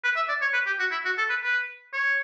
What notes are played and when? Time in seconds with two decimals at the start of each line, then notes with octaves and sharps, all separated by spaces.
0.04 B4
0.16 E5
0.29 D5
0.42 C#5
0.54 B4
0.66 G4
0.79 F#4
0.92 E4
1.05 F#4
1.18 A4
1.30 B4
1.43 B4
1.93 C#5